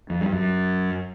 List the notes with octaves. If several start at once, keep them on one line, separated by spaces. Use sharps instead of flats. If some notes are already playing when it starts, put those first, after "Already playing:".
F2
G2
F#2